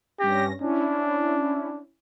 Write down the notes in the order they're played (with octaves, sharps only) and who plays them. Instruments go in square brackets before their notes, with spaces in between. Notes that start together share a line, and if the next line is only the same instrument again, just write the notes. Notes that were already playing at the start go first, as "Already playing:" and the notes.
[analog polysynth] G2 C#4 A#6 [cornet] G4
[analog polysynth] C#4 E4 [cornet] D4